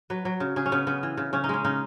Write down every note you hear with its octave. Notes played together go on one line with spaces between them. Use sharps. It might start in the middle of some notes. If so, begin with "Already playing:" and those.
F#3 B4
F#3
C#3
C#3 G#4
C#4
C#3 B3
C#3 B3
E3
C#3
C#3 C#4
D#4
G#3 C#4
C#3 D#4